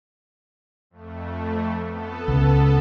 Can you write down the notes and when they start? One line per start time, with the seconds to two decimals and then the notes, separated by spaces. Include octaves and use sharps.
0.90 F2 A3
1.85 B3 A4
2.28 C#2